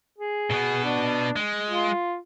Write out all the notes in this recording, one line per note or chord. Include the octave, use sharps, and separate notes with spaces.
G#4
B2 B3
D4
G#3
F4